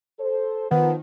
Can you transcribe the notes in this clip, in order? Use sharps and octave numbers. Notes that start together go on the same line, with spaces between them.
A4 C5
D#3 F3 B3